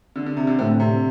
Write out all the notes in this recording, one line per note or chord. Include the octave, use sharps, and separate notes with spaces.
D3
D3
C3
D3
A2 D3 A3 C4
C3